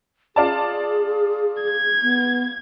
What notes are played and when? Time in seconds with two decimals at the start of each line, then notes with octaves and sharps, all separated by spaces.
0.36 F4 G#4 D5 A5
1.63 G#6
2.03 B3